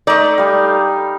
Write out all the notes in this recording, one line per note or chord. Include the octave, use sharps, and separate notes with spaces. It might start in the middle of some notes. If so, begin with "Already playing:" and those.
A3 D#4 D5
G3 F5